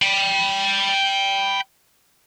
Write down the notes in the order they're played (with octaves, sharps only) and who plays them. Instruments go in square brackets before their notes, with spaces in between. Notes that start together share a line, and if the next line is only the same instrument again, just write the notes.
[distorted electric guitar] G5 B5